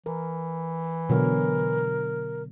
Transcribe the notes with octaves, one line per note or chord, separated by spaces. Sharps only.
E3 A#4
B2 D3 F#3 A#4